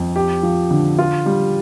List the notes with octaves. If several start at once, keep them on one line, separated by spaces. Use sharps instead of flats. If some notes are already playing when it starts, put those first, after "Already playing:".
Already playing: F2
G4
F3
D3
F4
G3